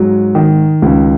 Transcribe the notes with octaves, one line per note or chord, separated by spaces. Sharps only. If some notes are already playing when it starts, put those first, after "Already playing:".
Already playing: G#2 F#3
D#3
C#2